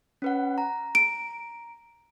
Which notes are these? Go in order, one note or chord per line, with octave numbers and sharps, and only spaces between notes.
C#4 B4 F#5
A#5
D7